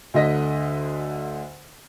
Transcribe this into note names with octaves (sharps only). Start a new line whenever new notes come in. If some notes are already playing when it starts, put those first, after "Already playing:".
D2 D3 D#5 A#6 B6